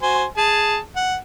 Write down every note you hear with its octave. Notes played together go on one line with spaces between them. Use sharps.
F#4 C5 G#5
G#4 A5
F#5